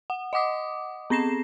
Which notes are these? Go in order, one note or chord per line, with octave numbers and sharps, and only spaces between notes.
F#5
D#5 F#5 D6 D#6
B3 C4 A#6 C7 E7